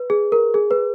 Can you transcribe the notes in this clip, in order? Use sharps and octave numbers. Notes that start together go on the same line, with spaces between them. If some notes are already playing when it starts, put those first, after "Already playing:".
Already playing: B4
G#4
A#4
G#4
B4